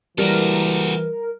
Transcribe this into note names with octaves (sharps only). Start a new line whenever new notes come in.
E3 G3 F#4 A4 A#4